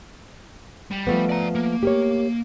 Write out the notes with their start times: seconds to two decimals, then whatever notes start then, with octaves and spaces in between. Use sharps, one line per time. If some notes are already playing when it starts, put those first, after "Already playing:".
0.91 G3
1.07 F3 A3 B3
1.29 D5 A#5
1.55 A#3
1.83 G4 A#4 C#5